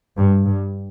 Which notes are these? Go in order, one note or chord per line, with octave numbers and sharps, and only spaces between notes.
G2
G2